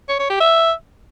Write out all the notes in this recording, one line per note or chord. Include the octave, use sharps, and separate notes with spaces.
C#5
C#5
G4
E5